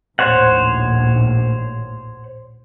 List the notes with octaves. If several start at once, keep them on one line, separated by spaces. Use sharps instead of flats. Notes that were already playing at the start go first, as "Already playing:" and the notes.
A#1 D#2 A2 C5 C#5 F#5